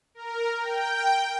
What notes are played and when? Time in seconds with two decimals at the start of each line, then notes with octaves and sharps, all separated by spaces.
0.15 A#4
0.61 G5